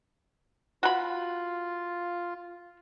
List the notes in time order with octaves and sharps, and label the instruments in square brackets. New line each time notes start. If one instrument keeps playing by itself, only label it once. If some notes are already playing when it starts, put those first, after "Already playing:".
[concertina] F4 [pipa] F#4 B5